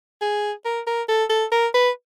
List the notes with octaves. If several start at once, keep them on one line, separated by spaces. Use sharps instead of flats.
G#4
A#4
A#4
A4
A4
A#4
B4